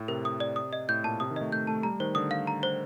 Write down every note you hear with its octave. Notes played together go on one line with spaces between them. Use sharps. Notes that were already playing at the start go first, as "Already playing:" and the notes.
Already playing: A2
C3 A#4
D#6
D5
D#6
D#5
A2 G6
A#2 A5
C3 D#6
D#3
A3 D#5
A3 G6
A3 A5
G3 A#5
D#3 C5
D3 D#6
F5
A#5
C5